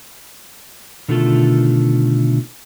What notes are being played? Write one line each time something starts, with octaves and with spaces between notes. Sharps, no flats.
B2 D3 D#3 A3 F4 A4